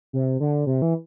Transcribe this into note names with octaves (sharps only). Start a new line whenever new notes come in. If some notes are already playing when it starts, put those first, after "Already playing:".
C3
D3
C3
E3